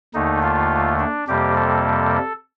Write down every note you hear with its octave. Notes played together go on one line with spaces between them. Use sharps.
D#2 D3 A3 D#4
F4
D4
F2 C3 G3 A#3 G4
A4